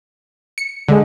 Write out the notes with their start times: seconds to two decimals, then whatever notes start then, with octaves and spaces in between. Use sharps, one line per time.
0.58 C#7
0.88 D3 G#3